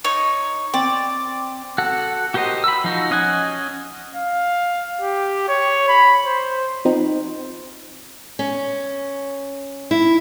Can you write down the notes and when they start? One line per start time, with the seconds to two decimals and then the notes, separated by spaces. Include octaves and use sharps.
0.04 D#4 C#5
0.74 C4 D5
1.78 F#4 A4 F#5
2.34 F#4 G4 A#4 C5 D#5
2.64 B5 E6
2.84 F3 D#4 F#4
3.11 C#4 D#5 F#5 G#5
4.16 F5
5.01 G4
5.48 C#5
5.88 B5
6.25 C5
6.85 F3 C4 D#4
8.39 C#4
9.91 E4